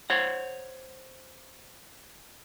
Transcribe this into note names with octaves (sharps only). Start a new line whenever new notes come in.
C5 C#5 F#5